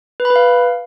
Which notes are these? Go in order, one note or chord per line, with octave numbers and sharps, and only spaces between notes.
B4
B5
B4
F5